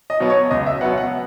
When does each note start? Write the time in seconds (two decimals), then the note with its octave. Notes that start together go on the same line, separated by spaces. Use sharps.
0.10 D#5
0.20 B2 F#3 B3
0.30 C#5
0.51 C#2 D#5
0.66 E5
0.81 B2 F#3 B3 F#5
0.98 F#5